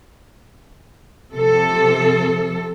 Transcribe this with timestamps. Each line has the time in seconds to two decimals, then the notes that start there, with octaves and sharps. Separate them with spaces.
1.33 C3 F3 A4